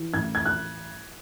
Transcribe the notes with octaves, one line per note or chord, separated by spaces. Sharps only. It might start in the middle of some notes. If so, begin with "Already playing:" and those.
Already playing: E3
A1 G#6
G#6
F#6